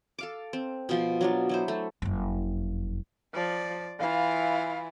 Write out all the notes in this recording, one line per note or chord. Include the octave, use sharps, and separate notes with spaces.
A4 F5 D6
C4
B2 F3 C6
F#3 D4 F4
F#3 E4 C5
A3
F#1 F2
F3 D5
E3 E4 F4 F5